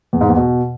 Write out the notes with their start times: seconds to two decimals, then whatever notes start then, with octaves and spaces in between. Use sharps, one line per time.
0.13 E2
0.21 G#2
0.29 E2
0.37 B2